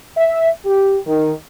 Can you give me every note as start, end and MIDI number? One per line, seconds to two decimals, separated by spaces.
0.17 0.48 76
0.66 0.98 67
1.07 1.32 51